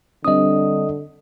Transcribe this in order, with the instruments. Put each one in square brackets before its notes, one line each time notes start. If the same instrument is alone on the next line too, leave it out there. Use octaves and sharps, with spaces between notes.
[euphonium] D3 [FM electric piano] G3 C4 D4 [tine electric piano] D#5 D#6